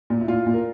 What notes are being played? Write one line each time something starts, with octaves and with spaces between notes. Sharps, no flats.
A#2
E4
A#2 F4
A#2
A#4